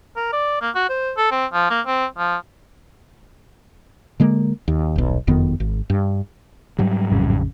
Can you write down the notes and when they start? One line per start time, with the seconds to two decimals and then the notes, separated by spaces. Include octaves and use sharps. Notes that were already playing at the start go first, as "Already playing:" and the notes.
0.17 A#4
0.33 D5
0.61 A#3
0.75 F#4
0.90 C5
1.17 A4
1.32 C4
1.53 F3
1.70 A#3
1.87 C4
2.18 F3
4.20 D3 G#3 A#3
4.68 D#2
4.96 D#1 B1
5.27 F#1 F2 D#3 B3
5.60 G#1
5.90 G2
6.79 G#2 F#3 G3
7.11 A1 F2 C#3